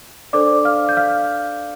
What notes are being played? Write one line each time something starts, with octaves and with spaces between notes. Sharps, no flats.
D4 A4 C5 D5 D6
F5 F6
G6
F5 F6